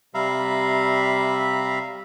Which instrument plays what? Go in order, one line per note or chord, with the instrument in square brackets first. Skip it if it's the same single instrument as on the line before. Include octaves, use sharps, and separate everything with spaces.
[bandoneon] C3 G3 E5 F5 A#5 B5